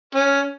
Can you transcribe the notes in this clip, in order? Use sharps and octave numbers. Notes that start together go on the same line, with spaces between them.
C#4